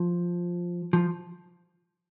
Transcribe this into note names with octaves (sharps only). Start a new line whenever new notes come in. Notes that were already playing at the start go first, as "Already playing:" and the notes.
Already playing: F3
F3